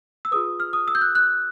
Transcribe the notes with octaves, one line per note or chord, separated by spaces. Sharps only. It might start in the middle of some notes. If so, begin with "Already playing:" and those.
E6
F4 G#4 B4 D#6
F6
D#6
E6
G6
F#6
F#6